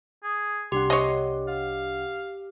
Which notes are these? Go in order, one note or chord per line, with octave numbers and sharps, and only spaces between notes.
G#4
C2 D4 G4 F#5 C6
C#5 D#5
F5